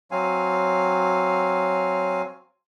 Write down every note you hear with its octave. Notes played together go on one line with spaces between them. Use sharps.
F#3 C4 F5 G#5